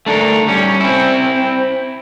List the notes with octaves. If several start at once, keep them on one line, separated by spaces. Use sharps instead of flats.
A3 D4 A4 A#4
G3 C#4
C4 E4